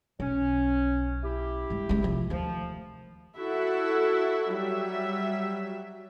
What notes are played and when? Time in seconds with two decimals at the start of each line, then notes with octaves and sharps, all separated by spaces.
0.20 B1 C#4
1.22 E4 G4
1.70 G2 G#3
1.89 C#2 G#3
2.02 C3 F3
2.30 D2 D#3 F3
3.36 E4 F#4 A4 E5
4.51 F#3 G3 E5